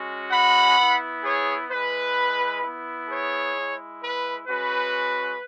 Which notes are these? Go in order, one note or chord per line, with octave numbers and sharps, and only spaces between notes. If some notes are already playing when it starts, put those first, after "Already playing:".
Already playing: G#3 C#4 F#4
F#5 B5
B3 E4
G#4 C#5
G#3 E4 B4
B3 E4
G#4 C#5
G#3 E4
B4
G#3 C#4 F#4 B4